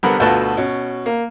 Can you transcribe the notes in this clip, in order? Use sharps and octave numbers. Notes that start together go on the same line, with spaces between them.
C2 D3 B3 A#4 B5
D2 B2 A3 F4 B4 A5
B2 C#4
A#3